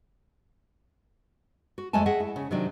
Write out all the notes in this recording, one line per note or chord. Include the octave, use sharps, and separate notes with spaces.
F#4
F2 F#3 G#3 A3 G#5 A5
G#4 D#5 E5 F#5 G5
E4
C#3
C3 D#3 F#3 D4